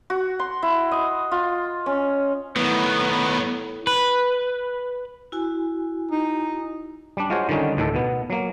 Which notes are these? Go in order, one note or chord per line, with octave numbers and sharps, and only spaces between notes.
F#4
C6
E4
D#5
F4
C#4
A2 D#3 F#3 B3
B4
E4 F#4 G#5
D#4
G3 D4
G#3 F4 F#4 C5 C#5
D3 D#3 G3 C#4 D#4
D2 A2 D#3 A4
B2 B3
F#3 A#3